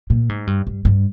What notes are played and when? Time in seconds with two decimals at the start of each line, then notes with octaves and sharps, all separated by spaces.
0.10 A#2
0.29 G#2
0.47 G2
0.67 G2
0.85 G2